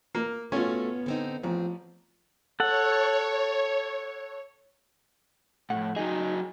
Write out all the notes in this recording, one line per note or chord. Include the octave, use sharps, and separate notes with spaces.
A#3
A3 B3 C#4 F4 F#4
D3 C4 D#4
A1 F3 C4 G#4
A4 C#5 F#5
F2 A2 F#5
F#3 D#4 G#4 D#5